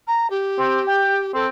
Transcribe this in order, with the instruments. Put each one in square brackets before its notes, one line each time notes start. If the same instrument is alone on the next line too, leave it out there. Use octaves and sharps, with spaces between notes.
[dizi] A#5
G4
[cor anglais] C4
G5
[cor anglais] C4 [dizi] A4